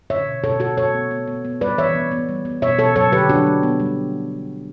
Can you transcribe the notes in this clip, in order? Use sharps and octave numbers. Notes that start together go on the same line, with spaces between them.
D3 C#5 E5
B2
B2 A4 C#5
A3 F#4 A4
A3 A4 C#5
B3
B3
B3
B3
G3 B4 D5
E3 C#5 E5
B3
B3
G3
B3
B2 C#5 E5
B2 A4 C#5
F#3 A4 C#5
D3 G4 B4
F#3 D4 F#4
A3
B3
G3